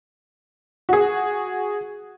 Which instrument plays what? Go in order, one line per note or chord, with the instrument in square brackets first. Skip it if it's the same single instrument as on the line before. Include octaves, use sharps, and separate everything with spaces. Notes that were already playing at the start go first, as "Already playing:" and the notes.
[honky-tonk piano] F#4 G#4